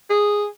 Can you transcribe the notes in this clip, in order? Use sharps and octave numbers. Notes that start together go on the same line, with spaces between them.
G#4